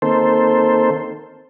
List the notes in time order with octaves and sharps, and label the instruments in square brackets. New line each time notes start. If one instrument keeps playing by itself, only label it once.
[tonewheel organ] D#3 A#3 C4 A4 C5